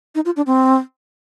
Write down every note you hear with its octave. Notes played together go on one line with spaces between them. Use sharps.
D#4
F4
D4
C4